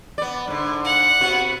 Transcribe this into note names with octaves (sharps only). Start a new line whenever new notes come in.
B3 D5
G#2 D3
F#5
C3 B3 F#4